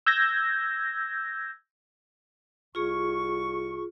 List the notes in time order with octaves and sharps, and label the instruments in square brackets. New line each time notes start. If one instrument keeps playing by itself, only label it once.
[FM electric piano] E6 G6 G#6 A#6
[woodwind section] C2 C3 C#6 [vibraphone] F4 G#4